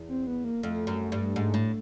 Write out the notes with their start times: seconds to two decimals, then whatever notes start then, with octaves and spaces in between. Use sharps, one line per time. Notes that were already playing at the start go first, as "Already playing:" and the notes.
Already playing: E2
0.09 C4
0.27 B3
0.44 A#3
0.63 F2 A3
0.87 F#2
1.12 G2
1.36 G#2
1.54 A2